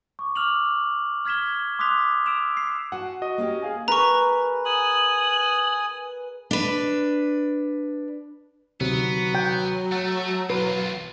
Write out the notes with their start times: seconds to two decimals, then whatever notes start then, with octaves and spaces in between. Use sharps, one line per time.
0.19 C#6 D6
0.36 D6 E6 F6 F7 F#7
1.25 F6 G#6 B6 E7 G7
1.79 C6 D6 D#6 F#6 B6 F7
2.26 E6 D7 E7 F7
2.57 C7
2.92 F#4 F#5 G#5 A5
3.22 F#4 D#5 D#6
3.38 A#3 C#4 G4
3.62 G#4 F5 G#5
3.88 G#4 A#4 B4 A#5 C#6
4.65 G#5 D#6 F#7
6.51 D4 B4
8.81 D2 C3 D#3 F#3 B3
9.35 G5
9.92 A3 F#5
10.50 B1 F4 B4